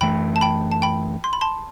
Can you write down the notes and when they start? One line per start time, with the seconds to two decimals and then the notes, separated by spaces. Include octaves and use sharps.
0.01 F#2 E3 A3 G5 B5
0.36 A5
0.41 G5 B5
0.71 A5
0.82 G5 B5
1.24 C6
1.33 B5
1.41 A5 C6